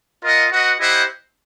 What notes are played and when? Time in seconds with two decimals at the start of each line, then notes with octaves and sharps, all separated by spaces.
0.23 F4 A#4 D#5 F#5
0.51 F#4 B4 D#5 F#5
0.80 E4 G4 C5 D#5 F#5